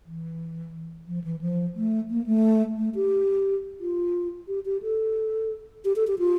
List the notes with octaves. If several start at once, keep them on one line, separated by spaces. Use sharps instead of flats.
E3
F3
E3
F3
A3
A#3
A3
A3
G4
F4
G4
G4
A4
G4
A4
G4
F4